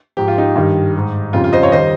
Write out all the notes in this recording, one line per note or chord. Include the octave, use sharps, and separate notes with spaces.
G#2 F3 G4
F4
D#4 G4
G2 D#3 G3
G#2 G3
F2 C#3 G3 F4
F4
C5 D#5
C#5 F5
D#3 G3 C5 D#5